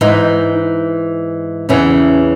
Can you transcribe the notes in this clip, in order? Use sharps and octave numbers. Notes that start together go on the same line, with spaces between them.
G#2 E3 D#4
E2 C#3 E3 C#4